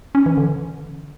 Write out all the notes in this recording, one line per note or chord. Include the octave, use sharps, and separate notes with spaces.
C#4
E3
D3